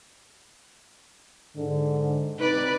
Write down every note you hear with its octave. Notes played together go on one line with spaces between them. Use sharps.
G#2 D3
C3 D#4 B4 D5